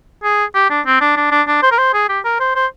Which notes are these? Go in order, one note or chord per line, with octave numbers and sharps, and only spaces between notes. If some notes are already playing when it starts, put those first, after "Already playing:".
G#4
G4
D4
C4
D4
D4
D4
D4
C5
A#4
C5
G#4
G4
A#4
C5
C5